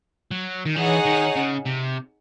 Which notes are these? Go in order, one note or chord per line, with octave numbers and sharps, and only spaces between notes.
F#3
D#3
E3 D#4 G#4 C#5 F#5
D#3
C#3
C3